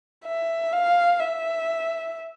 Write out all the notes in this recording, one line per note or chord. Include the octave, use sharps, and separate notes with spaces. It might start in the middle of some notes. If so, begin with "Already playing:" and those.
E5
F5
E5